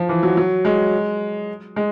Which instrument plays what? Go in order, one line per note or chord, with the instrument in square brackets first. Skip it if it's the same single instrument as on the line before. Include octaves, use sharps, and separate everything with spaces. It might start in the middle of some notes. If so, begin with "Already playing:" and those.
Already playing: [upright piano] F3
E3
F#3
F#3
G#3
G#3